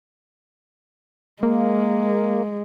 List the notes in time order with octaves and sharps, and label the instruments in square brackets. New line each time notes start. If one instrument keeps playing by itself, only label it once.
[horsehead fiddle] G#3 [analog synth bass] A#3